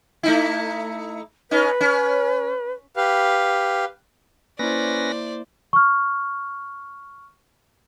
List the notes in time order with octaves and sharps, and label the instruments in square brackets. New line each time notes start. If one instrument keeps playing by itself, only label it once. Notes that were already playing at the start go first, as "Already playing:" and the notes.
[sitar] A3 D#4 E4
[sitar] C#4 D#4 [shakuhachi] B4
[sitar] C#4
[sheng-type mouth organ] G4 B4 F5
[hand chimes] A#3 E4 [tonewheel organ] C#4 B4 A#6 [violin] C5 D5
[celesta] C#6 F6